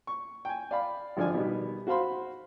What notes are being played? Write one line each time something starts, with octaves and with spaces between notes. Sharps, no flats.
C#6
G5 G#5
D5 F5 B5
G#1 D3 F3 D5 G#5
B2 D#3 G3 B3
F#4 C5 F5 B5 C6